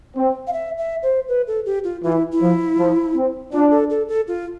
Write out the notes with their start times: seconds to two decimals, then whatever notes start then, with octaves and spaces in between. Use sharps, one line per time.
0.16 C4
0.47 F5
0.53 E5
0.78 E5
1.03 C5
1.29 B4
1.47 A4
1.66 G4
1.84 F4
2.03 E3 F4
2.12 E4
2.33 E4
2.40 F3
2.78 F3
3.15 C4
3.53 D4 F4
3.71 A4
3.90 A4
4.08 A4
4.28 F4